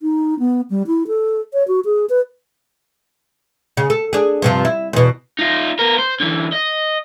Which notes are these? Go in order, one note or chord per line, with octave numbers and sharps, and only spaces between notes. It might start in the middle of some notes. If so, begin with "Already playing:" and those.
D#4
B3
G3
E4
A4
C#5
F#4
G#4
B4
C#3
A4
D4 G#4
G2 C3 F3
E4
E2 B2
D#4 F4
B3 A#4
C5
D3 E3
D#5